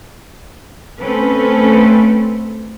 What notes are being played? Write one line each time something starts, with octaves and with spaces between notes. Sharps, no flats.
A3 C4 C#4 A4 B4